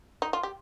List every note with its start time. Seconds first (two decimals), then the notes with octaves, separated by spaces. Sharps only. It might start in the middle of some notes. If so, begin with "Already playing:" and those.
0.22 D#4
0.33 F4
0.43 G4